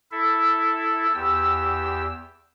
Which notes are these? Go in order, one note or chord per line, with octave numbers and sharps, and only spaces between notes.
E4 A4 E5
E2 G4 E6